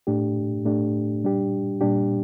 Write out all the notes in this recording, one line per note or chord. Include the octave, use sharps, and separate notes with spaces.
A2 A3 D4 G4
A2 A3 D4 G4
A#2 G3 D4 G4
A#2 G3 D4 G4